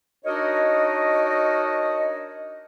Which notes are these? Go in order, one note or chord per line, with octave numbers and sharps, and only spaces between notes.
D4 D#4 F#4 A#4 C#5 D#5